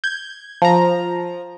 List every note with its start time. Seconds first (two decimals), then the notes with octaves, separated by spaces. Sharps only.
0.04 G6 G#6
0.62 F3 A#5